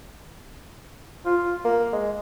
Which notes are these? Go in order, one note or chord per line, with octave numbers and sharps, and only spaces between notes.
F4
A#3
G#3